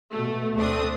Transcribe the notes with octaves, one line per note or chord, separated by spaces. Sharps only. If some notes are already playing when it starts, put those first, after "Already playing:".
B2 A3
D2 A3 C4 D4 D#6